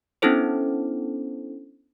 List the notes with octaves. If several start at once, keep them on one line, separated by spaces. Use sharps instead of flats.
B3 C#4 D4 E4 A4 C5